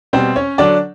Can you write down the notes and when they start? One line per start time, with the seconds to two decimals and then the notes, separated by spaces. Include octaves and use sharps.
0.13 B2 G3 C4 C5
0.36 C#4 C#5
0.58 D3 F#3 D4 D5